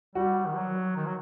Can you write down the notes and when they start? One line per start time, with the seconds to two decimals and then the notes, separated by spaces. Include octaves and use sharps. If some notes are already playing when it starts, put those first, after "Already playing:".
0.15 G3 F#4
0.45 D#3
0.56 F#3
0.96 D#3
1.06 F#3